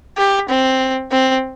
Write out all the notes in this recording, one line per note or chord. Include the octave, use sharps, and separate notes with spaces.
G4
C4
C4